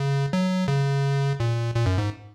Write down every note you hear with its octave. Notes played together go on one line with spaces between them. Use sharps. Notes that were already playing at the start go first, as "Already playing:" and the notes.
Already playing: C#3
F#3
C#3
A#2
A#2
F#2
G#2